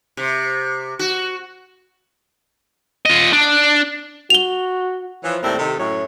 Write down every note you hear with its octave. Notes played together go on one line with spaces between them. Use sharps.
C3
F#4
F4 D#5
D4
F#4 F7 G7
E3 F3 C#5
D#2 A2 G3 C4 A#4 E5
C3 D#3 A4
F#2 A2 C#5